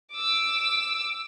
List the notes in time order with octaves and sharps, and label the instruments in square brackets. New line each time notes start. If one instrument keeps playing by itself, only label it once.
[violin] D6 E6